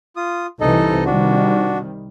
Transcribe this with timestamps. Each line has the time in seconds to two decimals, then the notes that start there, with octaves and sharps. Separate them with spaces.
0.16 F4 D#6
0.61 C2 C3 E3 D#4 A4 D#5
1.06 C3 D#3 G3 D4 F#4